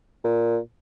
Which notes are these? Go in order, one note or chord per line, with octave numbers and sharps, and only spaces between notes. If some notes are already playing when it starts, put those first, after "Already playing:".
A#2